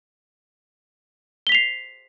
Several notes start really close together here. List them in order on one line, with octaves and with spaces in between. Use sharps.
G7 B6 F7 C7